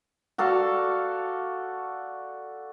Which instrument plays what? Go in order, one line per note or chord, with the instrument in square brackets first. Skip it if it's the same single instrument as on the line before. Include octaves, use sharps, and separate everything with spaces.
[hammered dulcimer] F#4 A4 D5 F5